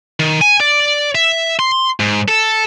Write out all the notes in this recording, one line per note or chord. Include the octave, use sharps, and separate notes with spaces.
D#3
G#5
D5
E5
C6
G#2
A4